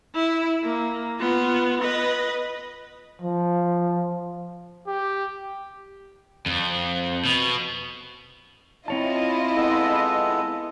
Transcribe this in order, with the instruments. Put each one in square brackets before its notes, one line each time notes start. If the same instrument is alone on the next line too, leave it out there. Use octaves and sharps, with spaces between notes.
[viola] E4
A#3
B3 F4
B4 D#5
[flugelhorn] F3
[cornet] G4
[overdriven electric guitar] F2
B2
[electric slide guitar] C4 C#5 A5 [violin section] E4 F4 D#5
[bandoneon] G#3 B3 A4